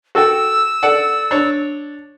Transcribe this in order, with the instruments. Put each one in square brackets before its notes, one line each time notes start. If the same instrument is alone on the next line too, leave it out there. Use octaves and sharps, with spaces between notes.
[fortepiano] F#4 A4 G5 [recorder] E6
[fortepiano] A4 D5 F#5
D4 C#5